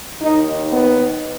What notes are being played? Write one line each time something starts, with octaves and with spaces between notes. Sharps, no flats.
D#2 D#3 D#4
B3